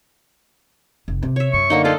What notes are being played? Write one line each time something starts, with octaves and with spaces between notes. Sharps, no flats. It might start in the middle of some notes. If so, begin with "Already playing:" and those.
F1
C3
C#5 E5
F#2 C#6
D3 A#3 D#4
F4 A4 D5 D#5